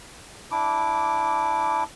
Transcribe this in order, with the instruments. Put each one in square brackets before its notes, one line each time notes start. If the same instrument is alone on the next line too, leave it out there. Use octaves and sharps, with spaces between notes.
[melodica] D4 E4 D6